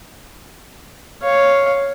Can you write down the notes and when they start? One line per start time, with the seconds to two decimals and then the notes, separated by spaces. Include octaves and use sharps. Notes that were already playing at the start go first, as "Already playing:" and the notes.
1.22 C#5 F5